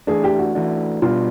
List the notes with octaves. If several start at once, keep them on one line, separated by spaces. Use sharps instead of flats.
E3 A3 D4 G#4
G4
F#4
E3 A3 D4
B2 G3 B3 D4 F4